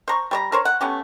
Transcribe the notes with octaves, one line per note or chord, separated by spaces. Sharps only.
C5 A#5 C#6
G3 C#5 A#5
A#4 C5 C#5
F#5
A3 B3 C#4 G4